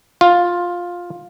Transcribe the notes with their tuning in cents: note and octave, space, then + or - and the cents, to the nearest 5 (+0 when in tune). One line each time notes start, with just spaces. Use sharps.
F4 +10